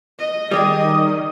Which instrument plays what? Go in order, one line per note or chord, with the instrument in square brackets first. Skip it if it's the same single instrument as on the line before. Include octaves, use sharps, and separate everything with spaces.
[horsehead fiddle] D#5
[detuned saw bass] D#3 [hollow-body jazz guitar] G3 G4 G#4 [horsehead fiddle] D#5 [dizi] D#6